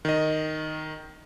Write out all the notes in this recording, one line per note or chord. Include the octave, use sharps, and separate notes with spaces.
D#3 D#5